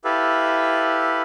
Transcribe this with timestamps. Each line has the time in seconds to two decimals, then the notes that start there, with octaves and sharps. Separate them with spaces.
0.04 E4 G4 A4 B4 E5 F5